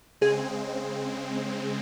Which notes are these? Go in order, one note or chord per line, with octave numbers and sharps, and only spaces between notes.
C#3 G#3 C4 G#4